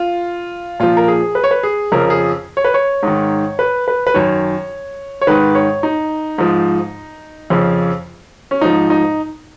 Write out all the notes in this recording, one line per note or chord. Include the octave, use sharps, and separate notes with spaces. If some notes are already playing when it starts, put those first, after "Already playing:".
Already playing: F4
A#2 F3 F4
A#4
G#4
B4
C#5
B4
G#4
F2 C#3 F3 A#4
G#4
C#5
B4
C#5
G#2 D#3
B4
B4
B4
F#2 D#3 C#5
C#5
G#2 D#3 B4
C#5
D#4
G#2 F3
F2 C#3 F3
C#4
G#2 F3 D#4
D#4